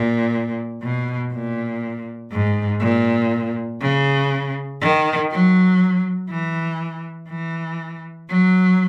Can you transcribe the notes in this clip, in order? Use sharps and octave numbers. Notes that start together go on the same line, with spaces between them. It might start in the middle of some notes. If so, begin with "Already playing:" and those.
Already playing: A#2
B2
A#2
G#2
A#2
C#3
D#3
F#3
E3
E3
F#3